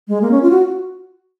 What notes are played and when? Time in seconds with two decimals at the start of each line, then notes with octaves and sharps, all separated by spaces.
0.08 G#3
0.21 A#3
0.31 C#4
0.42 F4
0.50 F#4